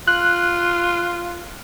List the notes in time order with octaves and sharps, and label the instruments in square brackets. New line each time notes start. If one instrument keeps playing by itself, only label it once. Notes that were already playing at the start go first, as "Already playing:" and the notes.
[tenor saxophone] F4 [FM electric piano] F#6